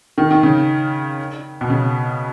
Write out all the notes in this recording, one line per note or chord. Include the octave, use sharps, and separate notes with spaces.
D#3
D#3
C#3
B2
C#3